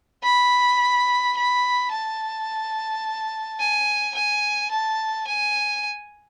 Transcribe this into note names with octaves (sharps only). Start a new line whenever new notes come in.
B5
B5
A5
G#5
G#5
A5
G#5